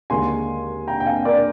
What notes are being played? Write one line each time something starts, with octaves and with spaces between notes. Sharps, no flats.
D#2 D3 G#3 G#5 C6
G5 A#5
G5
F5 G#5
A#4 D5